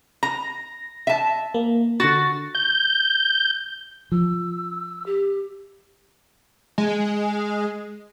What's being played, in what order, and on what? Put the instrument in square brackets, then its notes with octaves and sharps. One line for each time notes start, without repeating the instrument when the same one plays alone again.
[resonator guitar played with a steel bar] A#5 [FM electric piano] A#6
[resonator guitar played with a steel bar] E5 A5
[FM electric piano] A#3
[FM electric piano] D3 A6 [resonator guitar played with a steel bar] F#4
[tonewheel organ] G6
[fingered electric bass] F3 [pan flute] E6
[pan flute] G4
[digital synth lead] G#3